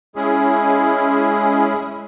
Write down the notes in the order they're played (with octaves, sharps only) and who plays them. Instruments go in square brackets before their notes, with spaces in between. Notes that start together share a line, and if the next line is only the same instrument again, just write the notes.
[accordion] G#3 C#4 E4 G#4